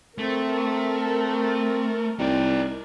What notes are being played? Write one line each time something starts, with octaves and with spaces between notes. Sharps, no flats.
A3 C4 A#4
C2 D#4 D5 G5